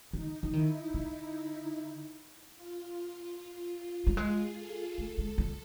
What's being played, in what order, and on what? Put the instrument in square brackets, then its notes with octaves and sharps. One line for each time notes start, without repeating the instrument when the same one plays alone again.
[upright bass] D#3 [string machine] D#4
[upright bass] E3
[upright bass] D#3 [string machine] E4
[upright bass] D3
[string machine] F4
F4
[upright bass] G3
[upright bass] G#3 [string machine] G#4
[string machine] A4
[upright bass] A3 [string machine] A4
[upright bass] G#3
G3